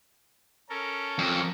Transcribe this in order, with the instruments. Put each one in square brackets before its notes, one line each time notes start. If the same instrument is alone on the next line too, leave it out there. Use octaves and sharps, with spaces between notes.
[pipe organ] C#4 A4 A#4
[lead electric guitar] F2